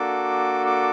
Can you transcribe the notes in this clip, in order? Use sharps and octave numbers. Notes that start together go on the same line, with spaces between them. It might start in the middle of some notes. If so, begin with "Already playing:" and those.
Already playing: A#3 D4 F#4 A4 D6
D6